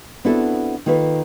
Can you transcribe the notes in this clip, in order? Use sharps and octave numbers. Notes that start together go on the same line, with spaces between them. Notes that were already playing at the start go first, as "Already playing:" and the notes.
B3 C4 D4 E4 F#4 A4
D#3 A#3 F4 A4 B4